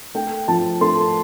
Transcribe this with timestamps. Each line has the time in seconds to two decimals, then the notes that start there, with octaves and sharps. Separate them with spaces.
0.15 A3 G5
0.48 F3 A5
0.81 A3 C6